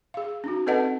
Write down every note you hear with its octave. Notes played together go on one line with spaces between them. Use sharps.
G#4 F5
C#4 D#4 F#4
C4 A4 B4 D#5 F#5 A5